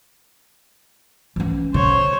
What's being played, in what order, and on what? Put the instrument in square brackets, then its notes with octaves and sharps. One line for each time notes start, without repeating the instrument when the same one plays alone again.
[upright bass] E3 C#4
[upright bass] D3 [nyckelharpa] C5 C#5